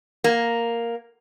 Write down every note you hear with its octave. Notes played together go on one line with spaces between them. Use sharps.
A#3